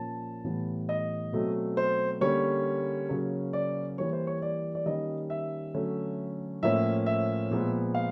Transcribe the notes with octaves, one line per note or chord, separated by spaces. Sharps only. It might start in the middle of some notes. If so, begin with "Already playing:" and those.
Already playing: A#2 F3 A#3 C#4 A5
A2 E3 G3 B3
D#5
B2 F#3 A3 C4
C5
D3 G3 A#3 C#4 C#5
C#3 F#3 A#3 C#4
D5
E3 G3 A#3 C#5
C5
C#5
D5
D5
D#3 G3 A#3 C#4 D#5
E5
D3 F#3 A3 C#4
A2 F3 A#3 C#4 E5
E5
A#2 F3 G#3 B3
F5